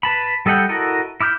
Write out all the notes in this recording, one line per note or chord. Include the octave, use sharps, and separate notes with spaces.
B4 A5 B5
G3 A4 D#5 F#5 G5
E4 F#4 A4 A#4 D#5
E4 D6 F6 G6